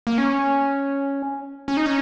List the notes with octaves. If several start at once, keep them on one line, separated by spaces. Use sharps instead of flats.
A#3
C#4
C#4
D#4
C#4